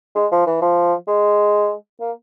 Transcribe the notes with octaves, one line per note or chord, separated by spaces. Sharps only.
G#3
F3
E3
F3
G#3
A#3